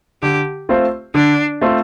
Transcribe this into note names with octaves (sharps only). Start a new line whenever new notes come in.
D3 G4
A3 C4 F4 C5
D3 D4
A3 C4 F4 C5